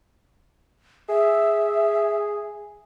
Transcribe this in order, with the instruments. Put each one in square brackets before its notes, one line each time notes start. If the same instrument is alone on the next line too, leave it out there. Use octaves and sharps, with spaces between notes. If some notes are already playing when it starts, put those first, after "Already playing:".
[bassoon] G#4 [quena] E5